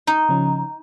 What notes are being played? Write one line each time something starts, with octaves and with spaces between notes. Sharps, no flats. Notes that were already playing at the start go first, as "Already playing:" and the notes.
D#4
C#3 F3 C#4